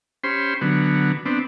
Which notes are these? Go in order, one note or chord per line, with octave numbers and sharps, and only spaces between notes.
C#4 G4 C5 B5 C6
D3 F#3 B3
B3 C4 D4